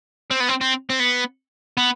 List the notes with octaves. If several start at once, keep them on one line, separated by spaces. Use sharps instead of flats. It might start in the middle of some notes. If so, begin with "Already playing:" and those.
C4
B3
C4
C4
C4
B3
B3